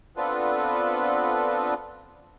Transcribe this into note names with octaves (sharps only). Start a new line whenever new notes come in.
B3 C4 D4 F4 A4 B4